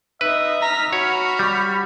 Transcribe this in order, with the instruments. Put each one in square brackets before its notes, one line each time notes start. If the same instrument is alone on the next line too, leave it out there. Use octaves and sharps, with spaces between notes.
[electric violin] D#4 D#5 [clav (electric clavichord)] B4 [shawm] E5
[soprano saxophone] A#5 [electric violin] F6 B6
[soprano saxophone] F#4 [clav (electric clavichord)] C#5 [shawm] B5 [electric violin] C#6 F6
[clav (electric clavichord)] G3